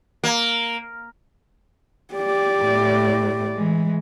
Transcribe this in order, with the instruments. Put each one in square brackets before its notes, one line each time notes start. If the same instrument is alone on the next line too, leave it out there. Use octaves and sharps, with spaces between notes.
[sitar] A#3
[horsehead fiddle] G4 D5
[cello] A2
E3 G#3